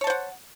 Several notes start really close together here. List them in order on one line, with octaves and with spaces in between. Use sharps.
C#5 A5 C5 F#5